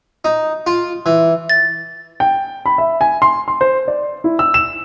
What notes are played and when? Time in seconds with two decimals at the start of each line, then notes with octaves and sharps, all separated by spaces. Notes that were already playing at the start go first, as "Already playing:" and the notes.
0.25 D#4
0.67 F4
1.06 E3
1.50 A6
2.20 G5
2.66 B5
2.78 E5
3.01 G#5
3.22 C6
3.48 C6
3.61 C5
3.88 D5
4.24 E4
4.39 E6
4.54 E7